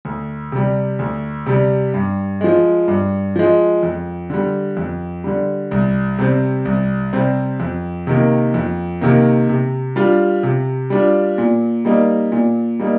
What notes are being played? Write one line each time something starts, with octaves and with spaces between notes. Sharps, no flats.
D2
C3 G3
D2
C3 G3
G2
F3 G#3
G2
F3 G#3
F2
D3 G3
F2
D3 G3
C2
C3 G3 C4
C2
C3 G3 C4
F2
C3 D#3 A#3
F2
C3 D#3 A#3
C3
G3 D4 F4
C3
G3 D4 F4
A#2
G3 A#3 D#4
A#2
G3 A#3 D#4